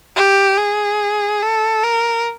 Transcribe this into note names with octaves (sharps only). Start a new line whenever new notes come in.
G4
G#4
A4
A#4